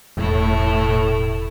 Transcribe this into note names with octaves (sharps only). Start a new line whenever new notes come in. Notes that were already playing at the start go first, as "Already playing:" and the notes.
E1 A2 A3 E4